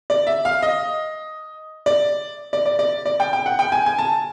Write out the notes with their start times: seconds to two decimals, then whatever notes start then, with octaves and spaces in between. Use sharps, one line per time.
0.10 D5
0.27 E5
0.45 F5
0.63 D#5
1.86 D5
2.53 D5
2.66 D5
2.79 D5
3.06 D5
3.20 G5
3.33 G5
3.46 F#5
3.59 G5
3.72 G#5
3.86 G#5
3.99 A5